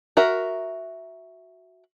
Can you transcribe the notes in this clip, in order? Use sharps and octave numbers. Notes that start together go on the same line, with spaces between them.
F#4 A#4 E5